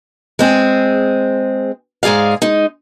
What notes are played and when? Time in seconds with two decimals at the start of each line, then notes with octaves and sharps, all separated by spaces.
0.39 G#3 C4 G#4
2.03 G#2 G#3 G#4 D5 F5
2.42 G#3 D#4